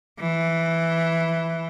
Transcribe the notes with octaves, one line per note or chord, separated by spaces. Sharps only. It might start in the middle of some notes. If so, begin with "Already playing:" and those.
E3